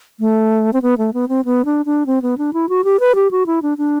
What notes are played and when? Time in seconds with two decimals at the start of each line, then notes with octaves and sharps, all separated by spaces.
0.20 A3
0.73 C4
0.82 B3
0.98 A3
1.14 B3
1.29 C4
1.45 B3
1.65 D4
1.86 D4
2.06 C4
2.22 B3
2.38 D4
2.53 E4
2.69 F#4
2.84 G4
3.00 B4
3.15 G4
3.31 F#4
3.46 E4
3.62 D4
3.78 D4